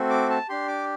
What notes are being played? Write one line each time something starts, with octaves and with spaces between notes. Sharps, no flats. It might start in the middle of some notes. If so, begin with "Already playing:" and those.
Already playing: A3 C4 F#4
D6
A5
D4 G4 C6
D6